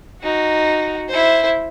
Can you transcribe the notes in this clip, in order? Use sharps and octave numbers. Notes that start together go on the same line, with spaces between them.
D#4 F#4
E4 C5